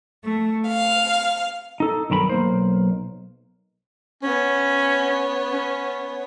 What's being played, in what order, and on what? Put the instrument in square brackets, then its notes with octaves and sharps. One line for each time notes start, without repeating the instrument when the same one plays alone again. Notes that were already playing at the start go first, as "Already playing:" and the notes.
[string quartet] A3
F5
[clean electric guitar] D#4 A4
B1 G2 D#3 A#5 B5
B1 A#3 C5
[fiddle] B3 C#5 [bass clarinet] C#4
[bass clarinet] C#4